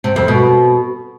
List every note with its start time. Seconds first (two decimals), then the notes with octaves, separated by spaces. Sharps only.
0.04 C3
0.16 F2
0.28 B2